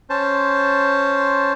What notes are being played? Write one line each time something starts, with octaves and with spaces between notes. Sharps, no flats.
C#4 C5 A5